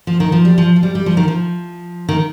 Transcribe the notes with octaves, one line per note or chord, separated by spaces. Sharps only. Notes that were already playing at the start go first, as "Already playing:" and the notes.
F3
D#3
F3
G3
F3
F3
G3
G3
F3
D#3
F3
D#3